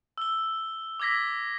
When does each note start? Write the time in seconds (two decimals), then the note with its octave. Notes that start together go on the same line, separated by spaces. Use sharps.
0.18 E6 G7
1.00 D6 E6 G#6 A#6 B6